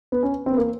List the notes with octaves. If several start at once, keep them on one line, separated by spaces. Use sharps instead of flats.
B3
C#4
C4
B3
A#3